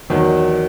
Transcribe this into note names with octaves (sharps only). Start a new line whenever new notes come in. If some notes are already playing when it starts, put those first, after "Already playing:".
E2 D#3 F#3